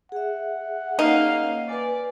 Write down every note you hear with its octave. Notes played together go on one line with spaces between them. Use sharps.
G#4 E5 F#5
A#3 C#4 D#4 F5
B4 D5 G#5